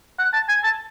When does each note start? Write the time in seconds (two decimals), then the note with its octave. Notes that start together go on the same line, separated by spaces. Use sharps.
0.19 F#5
0.33 A5
0.48 G#5
0.64 A5